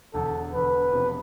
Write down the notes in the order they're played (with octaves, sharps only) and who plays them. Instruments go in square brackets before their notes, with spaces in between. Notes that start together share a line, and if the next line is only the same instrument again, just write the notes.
[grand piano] E1 E2 D3 [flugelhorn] A4
[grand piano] E1 E2 D3 [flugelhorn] B4
[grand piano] E1 E2 C3 F3